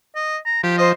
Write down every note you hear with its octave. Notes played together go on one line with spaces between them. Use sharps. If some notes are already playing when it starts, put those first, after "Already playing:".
D#5
A#5
F3 G4
C5 D#5